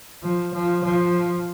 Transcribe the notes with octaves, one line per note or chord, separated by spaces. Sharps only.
F3
F3
F3